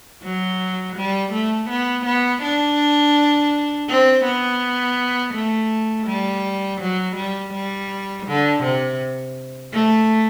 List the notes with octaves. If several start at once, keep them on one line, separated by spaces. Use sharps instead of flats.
F#3
G3
A3
B3
B3
D4
C4
B3
A3
G3
F#3
G3
G3
D3
C3
A3